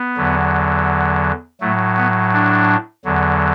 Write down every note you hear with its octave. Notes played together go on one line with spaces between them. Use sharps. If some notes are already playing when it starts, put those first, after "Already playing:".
Already playing: B3
E2 D3 F#3
A2 F#3 A3
B3
D4
E2 D3 F#3